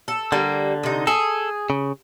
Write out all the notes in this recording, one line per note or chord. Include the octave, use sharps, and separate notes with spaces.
A4
D3 G3 A#3
C3 D#4
G#4 A4
C#3